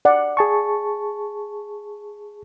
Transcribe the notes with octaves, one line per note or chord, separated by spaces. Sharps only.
D5 F#5
G#4 A5 C#6